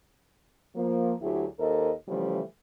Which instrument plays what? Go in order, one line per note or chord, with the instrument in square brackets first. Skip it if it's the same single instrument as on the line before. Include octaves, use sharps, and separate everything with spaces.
[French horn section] F3 A#3
D2 F#3 E4 G4 G#4
D#2 A4 A#4 C5 D#5
C#3 E3 F3 G3 A3